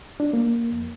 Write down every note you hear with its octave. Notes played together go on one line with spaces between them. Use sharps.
D4
A#3
F2